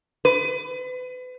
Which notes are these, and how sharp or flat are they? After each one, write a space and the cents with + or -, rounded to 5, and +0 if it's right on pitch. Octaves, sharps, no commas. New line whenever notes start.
B4 +35